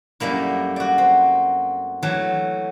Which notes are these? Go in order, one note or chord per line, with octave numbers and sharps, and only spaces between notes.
F#2 G3 A3 A#3 E4
F#4 D5
C4
E3 F#3 A3